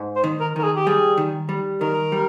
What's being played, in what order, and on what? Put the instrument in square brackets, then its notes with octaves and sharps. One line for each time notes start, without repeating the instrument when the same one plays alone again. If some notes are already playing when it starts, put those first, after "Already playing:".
Already playing: [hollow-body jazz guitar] G#2
[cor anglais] C5
[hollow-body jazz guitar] D#3
[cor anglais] A#4
[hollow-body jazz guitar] D#3 [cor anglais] A#4
[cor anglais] G#4
G4
[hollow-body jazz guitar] G3 [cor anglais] G#4
[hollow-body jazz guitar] D#3
G3
[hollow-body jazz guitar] D#3 [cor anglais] A#4
[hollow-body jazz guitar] G3